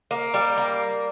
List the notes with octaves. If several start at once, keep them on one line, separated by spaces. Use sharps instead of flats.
A#3
G3
A#3